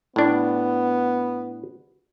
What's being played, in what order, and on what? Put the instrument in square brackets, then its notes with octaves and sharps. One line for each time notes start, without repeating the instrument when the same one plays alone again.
[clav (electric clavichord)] A2 D4 [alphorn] B3